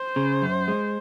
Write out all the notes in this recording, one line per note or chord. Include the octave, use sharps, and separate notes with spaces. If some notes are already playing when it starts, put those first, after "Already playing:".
Already playing: C5
C#3
F#2
G#3